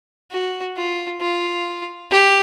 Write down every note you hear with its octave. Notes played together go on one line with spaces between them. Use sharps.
F#4
F4
F4
G4